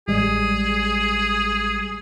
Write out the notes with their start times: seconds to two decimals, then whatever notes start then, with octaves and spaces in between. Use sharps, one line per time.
0.08 A1 G3 G#3 G#4